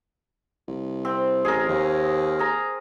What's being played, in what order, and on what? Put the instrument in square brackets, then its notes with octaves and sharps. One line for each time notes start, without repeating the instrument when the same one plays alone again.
[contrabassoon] C2
[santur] C4
[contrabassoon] A1 [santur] G#4 A#4
[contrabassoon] D#2
[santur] G#4 A#5